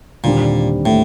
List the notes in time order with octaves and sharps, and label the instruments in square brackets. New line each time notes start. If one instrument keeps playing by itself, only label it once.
[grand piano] D#2 D3 G3 C4 [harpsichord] A#2
[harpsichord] A2